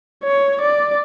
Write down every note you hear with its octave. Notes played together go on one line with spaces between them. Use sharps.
C#5
D5